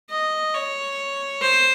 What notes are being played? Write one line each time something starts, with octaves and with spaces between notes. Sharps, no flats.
D#5
C#5
C5